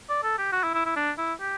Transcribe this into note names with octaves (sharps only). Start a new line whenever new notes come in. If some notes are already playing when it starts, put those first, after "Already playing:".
D5
A4
G4
F#4
E4
E4
E4
D4
E4
G4